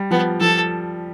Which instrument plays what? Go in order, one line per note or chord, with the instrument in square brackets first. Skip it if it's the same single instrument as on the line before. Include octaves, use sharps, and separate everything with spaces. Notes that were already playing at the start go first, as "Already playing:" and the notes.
Already playing: [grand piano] G3
[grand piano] F3 [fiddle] B3
[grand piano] F3 [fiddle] A4